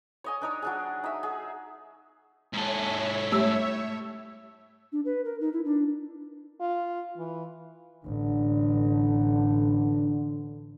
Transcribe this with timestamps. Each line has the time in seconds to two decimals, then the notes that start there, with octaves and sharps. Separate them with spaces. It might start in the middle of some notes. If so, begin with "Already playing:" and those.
0.24 C#5 D#5 G#5
0.41 D4 D#4 C#5
0.62 F#3 D4 G#4
1.04 D#4 E5
1.23 G#4
2.53 G#2 A4 C#5 E5
3.32 G3 A3 E6
4.92 D4
5.05 B4
5.25 A#4
5.41 D#4
5.53 E4
5.65 D4
6.61 F4
7.18 E3
8.05 A1 D3